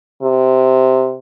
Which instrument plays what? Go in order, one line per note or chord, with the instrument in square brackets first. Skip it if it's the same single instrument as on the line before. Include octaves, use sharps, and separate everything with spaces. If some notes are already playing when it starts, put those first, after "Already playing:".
[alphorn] C3